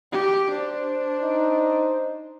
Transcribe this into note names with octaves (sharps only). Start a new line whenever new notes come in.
G4
D4 C5
D#4